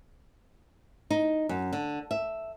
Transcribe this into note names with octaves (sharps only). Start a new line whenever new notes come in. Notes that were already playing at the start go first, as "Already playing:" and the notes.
D#4
F#2
D3
E5